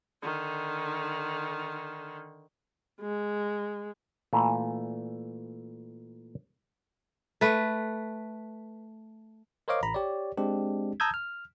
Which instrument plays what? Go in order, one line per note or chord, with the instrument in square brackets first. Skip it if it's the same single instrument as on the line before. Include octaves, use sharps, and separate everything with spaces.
[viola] D3 D#3
G#3
[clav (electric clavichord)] A#2 E3 A3
[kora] A3 B4
[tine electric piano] A#4 C5 C#5 D#5 F5 D6
A1 A#5 B5
G4 C#5 D5
G#3 C4 D4 G4
A5 A#5 D#6 E6 G6 G#6
F6